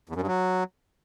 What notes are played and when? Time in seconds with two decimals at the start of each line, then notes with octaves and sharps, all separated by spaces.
0.09 E2
0.15 F#2
0.21 G2
0.27 F#3